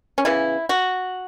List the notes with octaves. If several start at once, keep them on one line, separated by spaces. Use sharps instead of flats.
C#4
C#3 E3 B3 E4
F#4